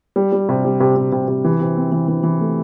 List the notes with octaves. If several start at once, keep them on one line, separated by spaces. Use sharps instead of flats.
G3
G3
C3
G3
C3
C3
C3
C3
E3
C3
C4
E3
E3
E3
A3